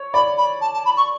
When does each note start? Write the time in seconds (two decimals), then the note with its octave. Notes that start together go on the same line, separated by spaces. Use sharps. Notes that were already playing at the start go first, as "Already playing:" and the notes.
Already playing: C#5
0.14 D5 B5
0.38 B5
0.61 A5
0.74 A5
0.85 B5
0.97 C#6